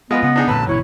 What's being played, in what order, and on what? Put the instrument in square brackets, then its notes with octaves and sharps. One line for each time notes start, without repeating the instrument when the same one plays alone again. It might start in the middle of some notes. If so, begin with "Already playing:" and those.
[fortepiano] G#3 F4 B4 [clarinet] B3 [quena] D#5
[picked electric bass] C#3 [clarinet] B3
[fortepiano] D4 D#4 G#4
[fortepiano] A1 F#2 B4 [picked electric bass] A#2 D3 [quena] A5
[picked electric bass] G1 B2 E3 [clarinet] E4 [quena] C#5